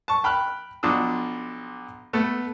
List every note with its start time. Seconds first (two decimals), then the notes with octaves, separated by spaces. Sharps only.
0.08 A5 C#6
0.24 G5 B5 F6 F#6
0.83 B1 F3 D4 D#6 E6
2.13 A3 B3